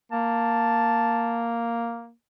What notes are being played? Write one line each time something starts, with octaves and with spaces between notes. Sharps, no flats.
A#3 A5